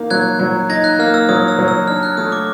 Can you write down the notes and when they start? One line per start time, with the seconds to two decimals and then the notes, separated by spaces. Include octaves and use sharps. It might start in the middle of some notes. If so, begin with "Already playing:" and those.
Already playing: A#3 D#4
0.10 F#3 F#6 G#6
0.40 F#3
0.69 D#4 G#6 A#6
0.84 F#6
0.99 A#3 F6
1.14 E6
1.29 F#3 D#6
1.48 E6
1.59 F#3
1.68 E6
1.88 D4 F6
2.03 F#6
2.17 A3 D#6
2.32 D6